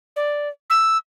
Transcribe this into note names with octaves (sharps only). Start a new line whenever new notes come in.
D5
E6